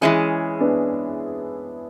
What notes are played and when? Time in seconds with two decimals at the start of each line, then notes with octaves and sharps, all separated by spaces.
0.01 E3 G#3 C#4 E4 G#4
0.60 B3 D4